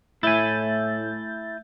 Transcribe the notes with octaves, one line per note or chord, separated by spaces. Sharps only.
A2 A3 E4 E5 G#5 G6 A6